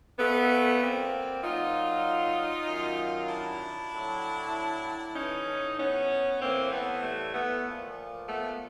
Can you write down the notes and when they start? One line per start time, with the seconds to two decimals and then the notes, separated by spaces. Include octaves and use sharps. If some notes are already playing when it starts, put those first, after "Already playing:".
0.18 A#2 F3 A3 B3
0.81 A#3 C4
1.42 A#2 F#3 D#4 F4
2.67 F#2 D#3 F#3
3.29 D4 E4
3.92 A2 F#3
5.15 A2 E3 C#4 D#4
5.77 B3 C#4
6.39 A2 E3 A#3 C4
6.71 A3 B3
7.02 G3 A3
7.33 A3 B3
7.64 A#2 F3
8.27 A3 B3